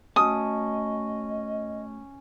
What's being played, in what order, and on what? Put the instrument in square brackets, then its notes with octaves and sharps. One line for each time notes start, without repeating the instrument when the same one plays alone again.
[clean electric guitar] A3 F#4 A5 [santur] C#4 [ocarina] D#5 [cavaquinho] D#6